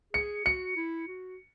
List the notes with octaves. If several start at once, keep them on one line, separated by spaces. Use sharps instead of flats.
G#4 C#7
F#4 C#7
E4
F#4